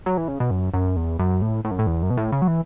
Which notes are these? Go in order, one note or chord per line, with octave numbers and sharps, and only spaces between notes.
F#3
E3
C#3
B2
F#2
F#2
E2
F#2
A2
A2
F#2
A2
E2
F#2
B2
A2
C#3
F#3
E3